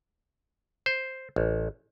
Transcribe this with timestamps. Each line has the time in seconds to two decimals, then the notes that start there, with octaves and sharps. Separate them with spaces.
0.86 C5
1.36 A1